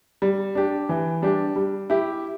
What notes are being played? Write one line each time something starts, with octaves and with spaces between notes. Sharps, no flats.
G3
D4 G4
E3
G3 D4 G4
G3
E4 G4